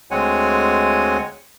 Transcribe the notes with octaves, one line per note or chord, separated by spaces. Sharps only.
D2 G#3 C4 C#5 F#5 G#5